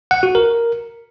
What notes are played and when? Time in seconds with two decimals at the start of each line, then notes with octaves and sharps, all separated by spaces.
0.11 F#5
0.23 F#4
0.35 A#4